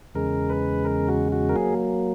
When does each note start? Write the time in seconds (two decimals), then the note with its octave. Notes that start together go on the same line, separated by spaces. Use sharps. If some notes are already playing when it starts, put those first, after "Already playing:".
0.15 E2 C#3 G#3 A#4
0.50 B4
0.85 A#4
1.08 F#4
1.32 F#4
1.49 A#4
1.56 F#3 A#3 G#4